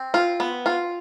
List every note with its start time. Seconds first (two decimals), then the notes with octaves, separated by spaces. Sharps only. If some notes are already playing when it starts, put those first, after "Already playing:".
Already playing: C4
0.14 F4
0.40 B3
0.66 F4